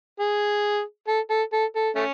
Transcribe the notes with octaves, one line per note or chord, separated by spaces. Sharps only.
G#4
A4
A4
A4
A4
A3 C#4